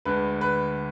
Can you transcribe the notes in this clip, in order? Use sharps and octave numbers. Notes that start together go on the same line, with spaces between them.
D2 D3 G#3 D4 B4
B4